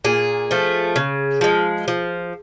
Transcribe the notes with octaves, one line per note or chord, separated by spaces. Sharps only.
A#2 G#4
F3 A3
C#3
F3 G#3
F3